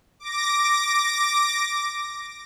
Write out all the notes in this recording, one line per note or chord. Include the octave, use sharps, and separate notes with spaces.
D6 A#6